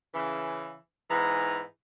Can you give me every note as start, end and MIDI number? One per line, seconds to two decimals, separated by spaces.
0.14 0.74 49
0.14 0.74 52
1.10 1.60 44
1.10 1.60 52
1.10 1.60 59
1.10 1.60 63